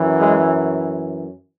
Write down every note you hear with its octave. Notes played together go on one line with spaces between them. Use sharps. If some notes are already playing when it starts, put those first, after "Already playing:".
Already playing: F#2 E3
G#3